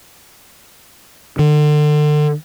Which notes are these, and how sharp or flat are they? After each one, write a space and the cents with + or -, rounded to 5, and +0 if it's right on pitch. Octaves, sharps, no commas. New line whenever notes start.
D3 +35